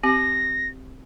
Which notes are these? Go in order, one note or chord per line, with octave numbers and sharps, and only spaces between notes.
C4 G4 A#6